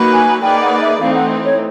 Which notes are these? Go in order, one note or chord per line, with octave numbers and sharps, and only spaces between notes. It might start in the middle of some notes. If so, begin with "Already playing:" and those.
Already playing: F#3 A#3 D#4 F#4 B4
G#5
A#3 D#4 G#4 B4 D5 G5
F#5
E5
E3 A3 C4 D#4 F5
F#5
C#5